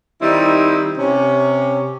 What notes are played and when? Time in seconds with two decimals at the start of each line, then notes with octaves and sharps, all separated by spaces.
0.21 D#3 G3 C4 D#4 E4
0.98 C3 C#4